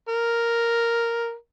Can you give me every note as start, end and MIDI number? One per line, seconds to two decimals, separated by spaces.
0.08 1.34 70